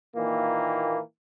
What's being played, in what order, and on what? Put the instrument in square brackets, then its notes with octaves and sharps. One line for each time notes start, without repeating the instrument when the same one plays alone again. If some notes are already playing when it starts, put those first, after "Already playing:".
[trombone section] A#2 D#3 E3 A#3